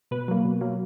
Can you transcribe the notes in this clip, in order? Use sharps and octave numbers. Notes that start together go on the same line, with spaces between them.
B2 B4
F#3 A#3
B2
F#3 A#3